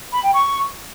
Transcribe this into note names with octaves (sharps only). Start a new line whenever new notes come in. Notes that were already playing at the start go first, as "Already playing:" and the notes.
B5
G5
C#6